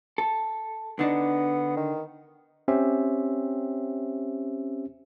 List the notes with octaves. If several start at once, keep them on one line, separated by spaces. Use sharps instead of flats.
A4
D3 B3 D4 D#4
D#3
C4 C#4 G4 C5 E5